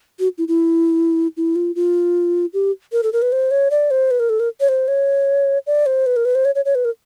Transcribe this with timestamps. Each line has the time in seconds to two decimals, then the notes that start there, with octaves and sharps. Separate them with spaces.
0.19 F#4
0.38 E4
0.48 E4
1.37 E4
1.55 F4
1.75 F4
2.53 G4
2.92 A#4
3.03 A4
3.13 A#4
3.22 B4
3.32 C5
3.51 C#5
3.70 D5
3.91 C5
4.11 B4
4.20 A#4
4.29 A4
4.40 A#4
4.60 C#5
4.68 C5
4.88 C#5
5.67 D5
5.86 C5
6.06 B4
6.16 A#4
6.25 B4
6.35 C5
6.45 C#5
6.55 C#5
6.65 C#5
6.75 B4
6.85 A#4